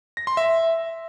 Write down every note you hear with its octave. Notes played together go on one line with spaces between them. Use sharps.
A#6
C6
E5